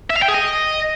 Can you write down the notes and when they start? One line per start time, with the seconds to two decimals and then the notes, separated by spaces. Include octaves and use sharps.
0.10 E5
0.16 F5
0.22 G5
0.28 G#4
0.34 D#5